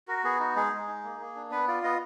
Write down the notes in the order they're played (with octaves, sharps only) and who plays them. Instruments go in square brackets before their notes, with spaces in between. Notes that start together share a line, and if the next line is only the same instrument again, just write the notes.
[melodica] F#4 A#4
B3 G#4
D#4 F#4
G#3 G#4
G#3
D#4
A#3
A#3
D4
B3 B4
F4 D5
B3 D#5